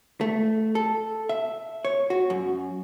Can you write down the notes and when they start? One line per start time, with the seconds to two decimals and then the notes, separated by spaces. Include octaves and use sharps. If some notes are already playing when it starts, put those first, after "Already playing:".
0.21 A3
0.75 A4
1.29 E5
1.85 C#5
2.10 F#4
2.30 F#2